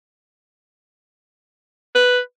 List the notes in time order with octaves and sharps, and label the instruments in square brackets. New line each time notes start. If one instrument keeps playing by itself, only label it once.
[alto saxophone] B4